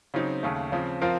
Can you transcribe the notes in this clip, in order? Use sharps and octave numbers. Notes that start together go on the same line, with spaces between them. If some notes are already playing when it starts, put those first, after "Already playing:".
C#3 F#3 C4 D#4
D#2 C#3 A3
C#3 F3 C4
F3 C4 F4 A#4